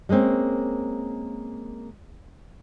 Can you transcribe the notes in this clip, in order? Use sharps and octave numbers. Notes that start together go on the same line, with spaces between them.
G3 G#3 A#3 C4 C#4